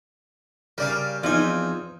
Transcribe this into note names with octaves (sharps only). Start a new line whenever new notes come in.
C#3 G3 A#4 D5 F5
E2 F3 C4 D#4 G#5